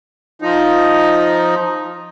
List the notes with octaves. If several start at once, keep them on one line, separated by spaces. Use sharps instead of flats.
F3 D#4